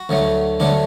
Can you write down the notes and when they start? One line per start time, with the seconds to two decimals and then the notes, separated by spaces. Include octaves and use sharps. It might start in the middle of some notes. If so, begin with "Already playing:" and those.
Already playing: F#4
0.09 D2 D3 F#3 A3
0.60 D2 D3 F#3 A3 D4